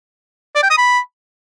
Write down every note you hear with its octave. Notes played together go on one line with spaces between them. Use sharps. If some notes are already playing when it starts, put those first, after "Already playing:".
D5
G5
D#6
B5